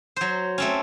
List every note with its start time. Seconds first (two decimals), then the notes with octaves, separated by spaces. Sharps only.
0.16 F#3 C5
0.58 A3 C4 C#4